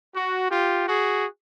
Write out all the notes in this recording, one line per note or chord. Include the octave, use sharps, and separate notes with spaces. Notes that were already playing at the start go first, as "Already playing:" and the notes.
F#4
F4 G4
F#4 G#4